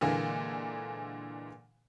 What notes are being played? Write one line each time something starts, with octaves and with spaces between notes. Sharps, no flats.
A#2 D3 E3 G#3 A#3